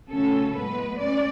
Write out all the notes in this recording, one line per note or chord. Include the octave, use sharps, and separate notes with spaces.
C#3 F#3 A3 C#4 A4
A2 G#3 B3 B4
C#4 D5